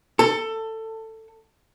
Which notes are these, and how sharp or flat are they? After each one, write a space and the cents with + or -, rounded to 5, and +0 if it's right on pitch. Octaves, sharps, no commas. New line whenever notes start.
A4 +15